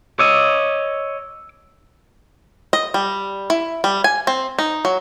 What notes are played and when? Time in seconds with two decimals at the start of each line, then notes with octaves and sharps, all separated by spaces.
0.19 C#5 D#5 D6 E6
2.73 D#5
2.94 G3
3.50 E4
3.84 G3
4.04 G#5
4.27 C4
4.59 D#4
4.85 F#3